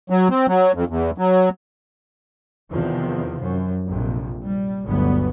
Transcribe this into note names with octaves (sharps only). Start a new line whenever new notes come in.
F#3
C4
F#3
F2
E2
F#3
E2 C3 D#3 F3
F#2
A#1 F2 C3
G3
G1 D2 F#3 B3